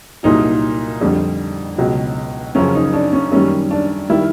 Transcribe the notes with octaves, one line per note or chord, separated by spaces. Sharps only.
C2 A#2 F#3 D#4
F2 D3 G3
C#2 B2 F#3
F#2 C#3 F3 C#4
D#4
D4
C#4
F#2 D#3 G3 C#4
D4
D#3 G3 E4